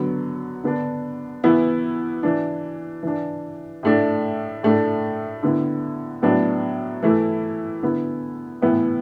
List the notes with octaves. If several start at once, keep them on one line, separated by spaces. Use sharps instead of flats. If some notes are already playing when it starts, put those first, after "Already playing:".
Already playing: D3 F#3 B3
D3 B3 D4
E3 B3 E4
E3 D4
E3 D4
A2 A3 D4
A2 A3 D4
D3 B3 E4
A2 F#3 B3 D4
E3 A3 E4
D3 B3 E4
A2 E3 B3 E4